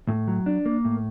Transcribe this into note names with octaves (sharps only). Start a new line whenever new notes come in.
A2
F#3
D4
A#3
A2